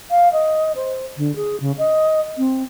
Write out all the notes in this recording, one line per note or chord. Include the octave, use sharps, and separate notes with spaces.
F5
D#5
C5
D3
G#4
C#3
D#5
C4